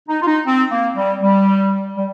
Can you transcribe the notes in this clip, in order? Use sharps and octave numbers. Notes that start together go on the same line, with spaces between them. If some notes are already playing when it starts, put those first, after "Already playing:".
D#4
F4
D#4
C4
A#3
G3
G3
G3